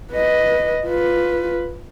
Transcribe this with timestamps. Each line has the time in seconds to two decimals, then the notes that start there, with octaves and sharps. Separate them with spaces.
0.13 B4 D#5
0.86 F4 B4